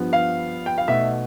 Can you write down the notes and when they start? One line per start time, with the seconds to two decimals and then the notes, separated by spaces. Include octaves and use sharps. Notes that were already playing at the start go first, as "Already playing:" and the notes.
Already playing: G2 F3 B3
0.13 F5
0.66 G5
0.78 F5
0.88 B1 B2 A3 E5